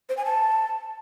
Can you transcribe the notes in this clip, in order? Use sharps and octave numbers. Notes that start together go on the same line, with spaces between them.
C5
G#5
A5